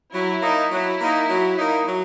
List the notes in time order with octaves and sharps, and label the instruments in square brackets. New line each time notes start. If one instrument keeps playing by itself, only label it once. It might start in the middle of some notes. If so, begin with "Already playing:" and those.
[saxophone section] F#3 [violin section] E4
[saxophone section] A#3 D#4
[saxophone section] F#3 [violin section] E4
[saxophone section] A#3 D#4
F#3
A#3 D#4
F#3